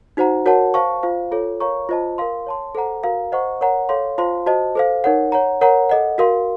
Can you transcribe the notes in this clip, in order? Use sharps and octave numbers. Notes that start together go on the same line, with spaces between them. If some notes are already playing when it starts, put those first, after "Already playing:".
D#4 F#4 C5 F#5 A#5
F#4 A#4 C#5 F#5 A5
C5 F5 A5 C#6
F4 C5 F5
F4 A4 C#5
A#4 C#5 F5 A#5 C#6
F4 C5 D#5 A5
A#4 F5 C6
C#5 A5 C6
A4 C5 F#5 A#5
F#4 A#4 F5 A#5
C5 D#5 F#5 A#5 C#6
A#4 C#5 F#5 A#5
A4 C#5 F5 C6
F4 C5 F5 A5 C6
F#4 C5 D#5 A5
A4 C5 F5
D#4 A#4 C#5 F#5
C#5 F#5 A#5
A#4 C#5 F#5 A#5
A4 D#5 F#5
F#4 A#4 F5 C6